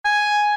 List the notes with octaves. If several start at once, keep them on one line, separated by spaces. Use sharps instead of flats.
G#5